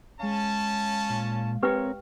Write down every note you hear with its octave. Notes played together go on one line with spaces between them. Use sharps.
G#3 C#4 F5 A5
A#2
C4 G4 A#4 B4 C#5 G5